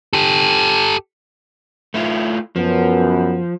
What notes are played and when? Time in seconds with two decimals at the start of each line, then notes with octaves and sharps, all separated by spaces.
0.13 G4 A4
1.94 A3 E4 F4
2.56 F#2 F3 B3